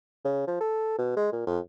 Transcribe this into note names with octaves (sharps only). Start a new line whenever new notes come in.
C#3
F3
A4
B2
G#3
A#2
F2